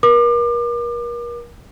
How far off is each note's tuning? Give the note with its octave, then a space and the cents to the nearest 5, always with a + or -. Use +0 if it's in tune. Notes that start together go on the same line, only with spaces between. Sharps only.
A#4 +35 D6 +35